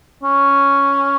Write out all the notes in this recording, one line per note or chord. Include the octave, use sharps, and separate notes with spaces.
C#4